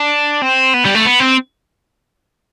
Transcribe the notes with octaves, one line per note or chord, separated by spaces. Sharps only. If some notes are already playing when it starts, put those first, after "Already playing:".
Already playing: D4
C4
B3
G3
A3
B3
C4